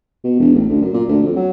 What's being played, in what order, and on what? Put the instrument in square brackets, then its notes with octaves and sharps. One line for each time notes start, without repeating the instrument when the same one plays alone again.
[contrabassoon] B2
E1
A1
D2
F#2
A#2
D2
F2
F#3